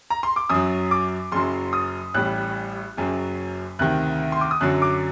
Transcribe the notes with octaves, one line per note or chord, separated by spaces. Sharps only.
A#5
C6
D6
F#2 F#3 D#6
D6
F#1 F#2 F#3 C6
D#6
A1 A2 G3 F#6
F#1 F#2 F#3
D2 C3 D#3 F#6
C6
D6
D#6
F#2 D3 F#3 F#6
D6